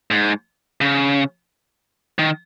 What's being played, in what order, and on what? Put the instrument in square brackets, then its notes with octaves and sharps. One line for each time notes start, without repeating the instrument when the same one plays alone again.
[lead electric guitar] G#2
C#3
D#3